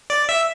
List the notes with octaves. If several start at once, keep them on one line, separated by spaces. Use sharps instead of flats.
D5
E5